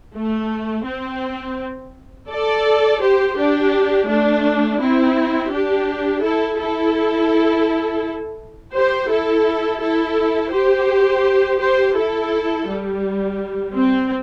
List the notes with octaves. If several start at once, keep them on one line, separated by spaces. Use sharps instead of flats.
A3
C4
A4 D5
G4 C5
D4 G4
A3 D4
C4 E4
D4 G4
E4 A4
E4 A4
G4 C5
E4 A4
E4 A4
G4 C5
G4 C5
E4 A4
G3
C4